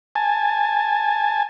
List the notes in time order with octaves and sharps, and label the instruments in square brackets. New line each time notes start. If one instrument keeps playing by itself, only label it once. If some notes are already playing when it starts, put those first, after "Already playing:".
[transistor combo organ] G#5 A5